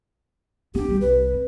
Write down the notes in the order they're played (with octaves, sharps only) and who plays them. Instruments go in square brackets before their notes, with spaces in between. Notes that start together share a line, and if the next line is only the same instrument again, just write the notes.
[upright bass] B3 D4 [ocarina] G4
[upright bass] D#3 G3
[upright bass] C2 [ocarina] B4
[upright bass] C4